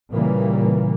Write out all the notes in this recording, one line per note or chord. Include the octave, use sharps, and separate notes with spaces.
A#2 C#3 E3 G3 A#3